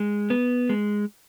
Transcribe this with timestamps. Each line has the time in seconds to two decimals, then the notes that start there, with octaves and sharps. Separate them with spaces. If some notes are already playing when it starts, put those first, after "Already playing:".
Already playing: G#3
0.30 B3
0.69 G#3